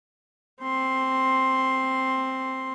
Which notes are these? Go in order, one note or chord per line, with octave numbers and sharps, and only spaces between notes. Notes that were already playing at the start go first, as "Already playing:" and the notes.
C4 C6